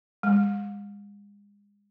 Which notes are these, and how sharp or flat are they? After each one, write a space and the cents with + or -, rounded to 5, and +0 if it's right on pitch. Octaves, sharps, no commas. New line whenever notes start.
G#3 -35